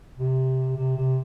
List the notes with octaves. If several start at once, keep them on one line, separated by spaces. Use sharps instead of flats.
C3
C3
C3